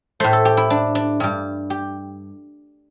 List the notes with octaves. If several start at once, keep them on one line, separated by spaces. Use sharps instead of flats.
A2 A3 C5
A4
G4
E4
D4
D4
G2 G3
G4